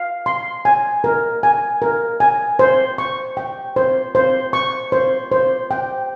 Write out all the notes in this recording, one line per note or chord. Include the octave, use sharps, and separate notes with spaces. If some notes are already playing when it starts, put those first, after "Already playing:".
Already playing: F5
C6
G#5
A#4
G#5
A#4
G#5
C5
C#6
G5
C5
C5
C#6
C5
C5
G5